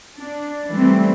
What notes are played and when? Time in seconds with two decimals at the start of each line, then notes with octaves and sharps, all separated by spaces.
0.16 D4
0.70 E3 G3 A3 C4